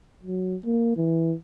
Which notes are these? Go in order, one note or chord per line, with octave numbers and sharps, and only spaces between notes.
F#3
A#3
E3